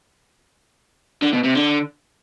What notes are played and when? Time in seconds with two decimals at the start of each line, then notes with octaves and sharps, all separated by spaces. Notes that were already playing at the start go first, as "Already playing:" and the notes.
1.22 D3
1.33 B2
1.44 C3
1.55 D3